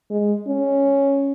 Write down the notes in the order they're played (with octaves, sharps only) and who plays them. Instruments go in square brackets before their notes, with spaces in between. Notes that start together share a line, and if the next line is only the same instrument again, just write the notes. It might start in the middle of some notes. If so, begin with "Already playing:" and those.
[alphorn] G#3
C#4